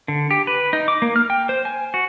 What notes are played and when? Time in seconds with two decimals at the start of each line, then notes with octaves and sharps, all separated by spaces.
0.08 D3
0.31 G4
0.47 B4
0.73 D#4
0.88 D6
1.02 A#3
1.16 F6
1.30 G5
1.49 C5
1.65 G#5
1.94 F#4